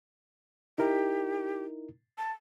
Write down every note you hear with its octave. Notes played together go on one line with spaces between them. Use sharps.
D#4 E4 G4 A#4
A5